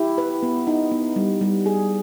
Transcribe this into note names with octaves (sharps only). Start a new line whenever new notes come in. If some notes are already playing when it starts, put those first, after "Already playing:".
Already playing: E4 G4
B4
B3
D#4
B3
G3
G3
G#4